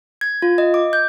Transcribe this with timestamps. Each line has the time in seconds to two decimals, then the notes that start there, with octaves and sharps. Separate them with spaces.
0.21 G#6
0.42 F4
0.58 D#5
0.74 D6
0.93 G6